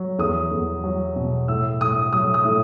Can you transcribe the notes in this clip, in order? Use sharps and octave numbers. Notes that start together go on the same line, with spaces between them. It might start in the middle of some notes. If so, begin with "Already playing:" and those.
Already playing: F#3
E2 D#6
E2
F#3
B2
A2 E6
A2 D#6
F#3 D#6
D#6
A2